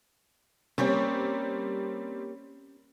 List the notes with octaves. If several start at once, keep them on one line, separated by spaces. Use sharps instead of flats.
G3 A#3 C4 C#4 G4 C#5